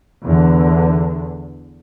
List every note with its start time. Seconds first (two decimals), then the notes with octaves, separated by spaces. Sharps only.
0.23 E2 D3